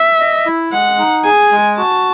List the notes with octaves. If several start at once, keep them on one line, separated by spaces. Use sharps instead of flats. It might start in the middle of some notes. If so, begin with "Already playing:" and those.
Already playing: E5
D#5
E4
G#3 F#5
D#4
G#4 G#5
G#3
F#4 A5